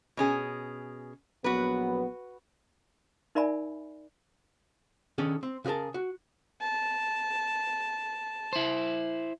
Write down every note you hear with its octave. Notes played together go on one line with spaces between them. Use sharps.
B2 C#4 G#4
A#1 F#3 B3 F#4 B4
D#4 A#4 D5 E5 G#5 B5
D#3 C#4 D4 G#4 A4
C4
C#3 F#4 G#4 A#4 A5
F#4
A5
E4 C5